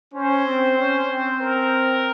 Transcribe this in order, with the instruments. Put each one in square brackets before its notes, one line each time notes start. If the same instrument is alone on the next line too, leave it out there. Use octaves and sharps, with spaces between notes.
[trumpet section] C#4 [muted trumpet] C5
[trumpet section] C4
C#4
C4
[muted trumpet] A#4